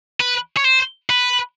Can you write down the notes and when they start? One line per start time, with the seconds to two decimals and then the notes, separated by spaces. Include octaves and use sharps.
0.20 B4
0.57 C#5
0.65 C5
1.10 B4